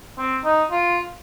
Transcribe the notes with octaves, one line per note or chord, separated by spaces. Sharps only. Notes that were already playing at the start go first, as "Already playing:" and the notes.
C4
D#4
F4